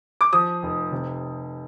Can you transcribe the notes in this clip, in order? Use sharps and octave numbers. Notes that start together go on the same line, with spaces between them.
D6
F3 D#6
F1
C3